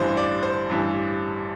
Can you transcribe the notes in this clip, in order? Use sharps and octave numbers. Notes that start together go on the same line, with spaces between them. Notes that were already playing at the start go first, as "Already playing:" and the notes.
Already playing: A1 G2 E3 C5
D5
C5
A1 G2 E3